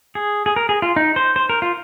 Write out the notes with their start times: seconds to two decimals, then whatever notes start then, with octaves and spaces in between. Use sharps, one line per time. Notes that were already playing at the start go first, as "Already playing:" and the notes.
0.15 G#4
0.46 G#4
0.56 A#4
0.69 G#4
0.82 F4
0.96 D#4
1.16 C5
1.36 C5
1.50 A#4
1.62 F4